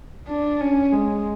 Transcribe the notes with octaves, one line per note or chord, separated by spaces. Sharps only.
D4
C#4
G#3